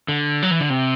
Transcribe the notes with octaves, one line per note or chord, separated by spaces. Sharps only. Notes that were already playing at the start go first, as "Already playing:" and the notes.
D3
F#3
E3
D3
C3